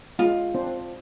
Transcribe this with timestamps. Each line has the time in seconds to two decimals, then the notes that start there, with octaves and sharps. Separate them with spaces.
0.19 G#3 C#4 F4
0.55 C4 D4 C5